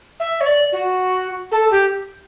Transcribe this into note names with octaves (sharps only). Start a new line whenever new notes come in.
E5
C#5
D5
F#4
A4
G4